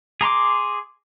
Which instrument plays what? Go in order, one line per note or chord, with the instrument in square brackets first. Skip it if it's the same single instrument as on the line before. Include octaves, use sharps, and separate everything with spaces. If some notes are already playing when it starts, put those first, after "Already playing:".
[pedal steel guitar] G#4 A#5 C6 D6